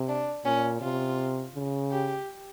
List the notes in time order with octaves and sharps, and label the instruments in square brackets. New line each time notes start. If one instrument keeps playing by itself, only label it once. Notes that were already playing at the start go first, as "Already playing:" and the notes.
Already playing: [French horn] C3
[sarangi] D4
[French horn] A#2 [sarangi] C#4
[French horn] C3 [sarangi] F4
[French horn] C#3
[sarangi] G4